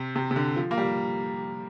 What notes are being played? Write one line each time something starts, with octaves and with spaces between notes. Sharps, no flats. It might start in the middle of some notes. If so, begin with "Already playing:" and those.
Already playing: C3
C3
C3
D3
F3
A#3
G3